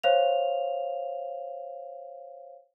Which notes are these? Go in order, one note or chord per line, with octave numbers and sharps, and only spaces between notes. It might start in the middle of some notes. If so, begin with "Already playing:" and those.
C5 C#5 F5 F7